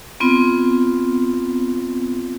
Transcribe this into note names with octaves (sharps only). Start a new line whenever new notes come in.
B3 C4 F4